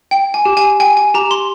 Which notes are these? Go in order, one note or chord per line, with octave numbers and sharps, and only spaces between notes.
G5
G#5
G4
G#5
G5 G#5
G#5
G4 A#5
C6